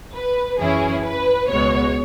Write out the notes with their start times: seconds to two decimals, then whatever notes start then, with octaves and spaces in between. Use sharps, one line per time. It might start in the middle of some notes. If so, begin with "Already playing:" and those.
0.16 B4
0.59 F#2 E3 C#4 E4 G#4
1.05 B4
1.50 C#2 B2 G#3 B3 C#5